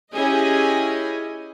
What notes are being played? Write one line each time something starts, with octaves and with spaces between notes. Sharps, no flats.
C#4 E4 G4 G#4 D#5 G#5